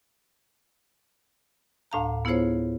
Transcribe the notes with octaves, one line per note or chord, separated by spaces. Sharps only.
D2 A2 D4 F5 A5 A#5
B3 E4 F4 G#4 C5 C#5